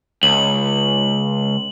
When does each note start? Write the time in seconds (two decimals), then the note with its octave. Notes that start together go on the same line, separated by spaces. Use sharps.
0.23 C#2 F#7